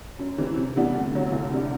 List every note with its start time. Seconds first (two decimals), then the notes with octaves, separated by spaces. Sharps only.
0.19 F#2
0.38 E3 G3 C4 E4
0.57 C3
0.76 E3 G3 B3 D4
0.95 D2
1.14 D3 F#3
1.32 C2
1.52 C3 G3 D4